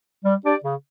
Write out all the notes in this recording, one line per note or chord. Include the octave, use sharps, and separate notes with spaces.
G3
D4 G4 D5
C#3